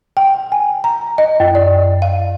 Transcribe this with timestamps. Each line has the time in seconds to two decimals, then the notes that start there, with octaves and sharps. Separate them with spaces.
0.17 G5
0.52 G#5
0.84 A#5
1.18 D#5
1.40 F#2
1.55 D5
2.02 F5